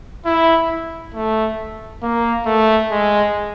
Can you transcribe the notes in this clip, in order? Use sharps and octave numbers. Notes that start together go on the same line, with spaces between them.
E4
A3
A#3
A3
G#3